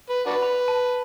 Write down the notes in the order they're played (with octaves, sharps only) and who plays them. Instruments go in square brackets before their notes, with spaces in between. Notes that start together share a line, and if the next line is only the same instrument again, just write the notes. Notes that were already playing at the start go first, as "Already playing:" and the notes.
[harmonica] B4
D4 F#4 B4
[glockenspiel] B5
A5